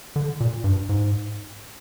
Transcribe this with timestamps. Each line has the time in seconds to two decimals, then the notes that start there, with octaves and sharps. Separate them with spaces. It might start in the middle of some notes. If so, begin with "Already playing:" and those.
0.16 D3
0.40 A#2
0.64 G2
0.89 G#2